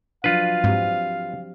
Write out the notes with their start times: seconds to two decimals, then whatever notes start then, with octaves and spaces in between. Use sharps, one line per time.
0.24 F3 F#3 D4 F4 B4 F5
0.64 G#2 C4 G4